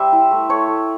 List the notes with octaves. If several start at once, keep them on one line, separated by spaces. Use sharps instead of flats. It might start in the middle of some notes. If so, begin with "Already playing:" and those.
Already playing: G3 C5 E5
E4
A3
A3 C#5
A3